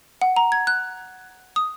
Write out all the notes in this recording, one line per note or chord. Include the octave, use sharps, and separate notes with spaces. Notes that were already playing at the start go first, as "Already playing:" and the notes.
F#5
A#5
G#6
F#6
D#6